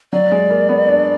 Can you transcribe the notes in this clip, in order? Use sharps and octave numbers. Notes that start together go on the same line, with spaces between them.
F#3 D5
G#3
A#3
B3
D4